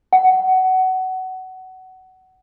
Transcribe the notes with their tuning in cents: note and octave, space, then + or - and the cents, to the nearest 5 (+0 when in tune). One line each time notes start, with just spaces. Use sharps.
F#5 +20